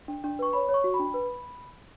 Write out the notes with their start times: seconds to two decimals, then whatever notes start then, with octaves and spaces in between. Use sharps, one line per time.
0.08 D4
0.24 D4
0.39 B4 C#6
0.53 C#5 B5
0.69 C#5
0.74 C#6
0.84 F#4
0.94 B5
1.00 D4
1.14 B4